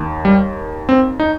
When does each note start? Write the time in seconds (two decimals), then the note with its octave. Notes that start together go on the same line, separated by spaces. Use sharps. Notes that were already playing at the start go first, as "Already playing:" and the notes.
Already playing: D#2 D#3
0.25 G3
0.89 C4
1.20 D#4